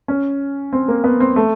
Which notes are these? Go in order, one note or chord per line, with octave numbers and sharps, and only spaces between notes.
C#4
C4
A#3
B3
C4
A3